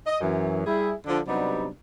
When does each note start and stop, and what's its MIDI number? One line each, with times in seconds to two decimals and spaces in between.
0.06 0.19 75
0.21 0.62 42
0.21 0.62 52
0.66 0.93 55
0.66 0.93 64
0.66 0.93 68
1.07 1.20 50
1.07 1.20 53
1.07 1.20 62
1.27 1.67 48
1.27 1.67 54
1.27 1.67 55
1.27 1.67 59
1.27 1.67 62
1.27 1.67 63